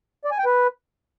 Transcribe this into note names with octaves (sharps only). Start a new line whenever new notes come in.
D5
G#5
G5
B4